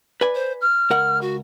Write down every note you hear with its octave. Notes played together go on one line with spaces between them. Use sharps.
B4 D5 G#5
C5
F6
C#2 A#4 F#5
F#4